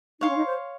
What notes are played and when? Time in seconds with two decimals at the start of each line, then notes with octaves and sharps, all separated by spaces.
0.21 D#4 C#5 F5 C6
0.29 C#4
0.36 D#4
0.45 C5